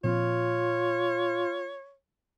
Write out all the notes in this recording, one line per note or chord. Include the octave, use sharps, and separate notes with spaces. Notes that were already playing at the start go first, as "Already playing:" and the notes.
A#2 F3 C4 F4 C#5